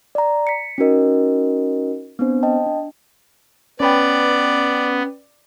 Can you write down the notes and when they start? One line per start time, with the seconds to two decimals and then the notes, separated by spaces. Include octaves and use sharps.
0.15 D5 A#5
0.47 B6 C#7
0.78 C#4 D#4 F#4 A#4 D#5
2.19 B3 C4 D4 C5
2.43 D#5 G5 A5
2.66 D4
3.80 B3 C#4 B4 D5 G5